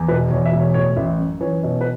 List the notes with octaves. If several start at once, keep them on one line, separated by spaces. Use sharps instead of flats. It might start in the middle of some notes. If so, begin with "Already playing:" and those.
Already playing: E2
E1 B4
E2 C#5
E5
E1
C#5
A2 C#5
A1 E5
F#2
E3 C#5
B2 C#5
B4